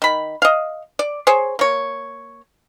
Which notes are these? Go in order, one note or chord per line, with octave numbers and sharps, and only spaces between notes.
D#3 B5
D#5 F5
D5
G#4 C5 C#5
A#3 C#5